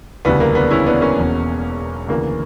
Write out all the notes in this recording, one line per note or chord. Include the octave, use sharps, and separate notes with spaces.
E1 D2 C#3 E3 G3 B3
A#3
B3 D4
C#4 E4
B3 D4
A#3 C#4
E1 E2 B2
D2 C#3 E3 A#3